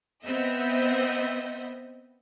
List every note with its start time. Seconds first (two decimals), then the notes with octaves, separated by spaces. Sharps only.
0.24 B3 C4 D#5 E5